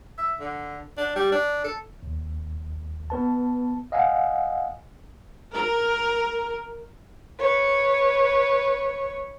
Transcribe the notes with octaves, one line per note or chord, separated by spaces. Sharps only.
E5
D3
D4
G3
D4
A4
D#2
B3 B4 A5
D#5 F5 F#5 G#5
A#4
B4 C#5